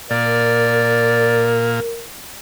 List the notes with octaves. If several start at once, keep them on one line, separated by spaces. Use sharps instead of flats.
A#2 A#4 D5